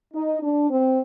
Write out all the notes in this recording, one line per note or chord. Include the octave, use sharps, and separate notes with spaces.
D#4
D4
C4